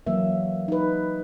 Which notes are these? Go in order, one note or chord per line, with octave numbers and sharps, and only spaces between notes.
E3 F#3 A#3 E5
D#4 B4